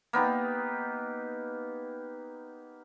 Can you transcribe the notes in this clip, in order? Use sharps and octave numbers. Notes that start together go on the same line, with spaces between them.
A#3 B3 D#4 G4